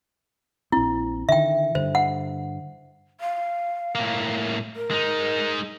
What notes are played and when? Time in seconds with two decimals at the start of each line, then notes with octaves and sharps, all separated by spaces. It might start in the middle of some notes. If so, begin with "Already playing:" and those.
0.72 A#1 C4 E4
1.29 D3 D#3 E5 G5
1.75 G2 D3 C5
1.95 F#5
3.21 F5
3.95 A2 A#3
4.76 A#4
4.91 G#3 D#4